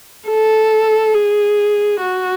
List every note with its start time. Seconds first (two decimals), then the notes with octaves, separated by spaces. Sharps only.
0.28 A4
1.14 G#4
2.00 F#4